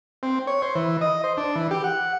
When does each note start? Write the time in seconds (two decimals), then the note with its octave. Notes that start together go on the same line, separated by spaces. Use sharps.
0.23 C4
0.47 C#5
0.62 C5
0.75 E3
1.01 D#5
1.24 C5
1.37 D4
1.56 E3
1.71 G4
1.84 F#5